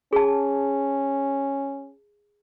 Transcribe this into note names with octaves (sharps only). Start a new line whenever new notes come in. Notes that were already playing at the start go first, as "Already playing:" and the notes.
C#4 G#4 A5